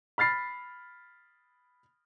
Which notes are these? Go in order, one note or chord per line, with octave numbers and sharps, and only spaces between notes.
B5 F6 A6 C7